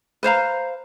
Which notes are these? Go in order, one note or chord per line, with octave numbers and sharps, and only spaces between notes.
B4 C5 F5 A#5